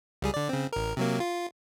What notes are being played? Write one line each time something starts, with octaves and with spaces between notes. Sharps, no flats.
C#2 G3 G#4
D3 D5
C#3 C4
A1 A#4
C3 F#3 A#3
F4